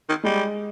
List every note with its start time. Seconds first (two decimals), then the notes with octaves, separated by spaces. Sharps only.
0.09 D#3
0.24 G3 G#3